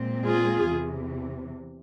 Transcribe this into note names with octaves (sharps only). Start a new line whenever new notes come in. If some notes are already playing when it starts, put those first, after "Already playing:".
Already playing: A#2 G#3 C4
F4 G#4
E2 C3 E3